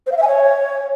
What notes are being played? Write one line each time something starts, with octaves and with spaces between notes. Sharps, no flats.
C5
F5
E5
G#5
C#5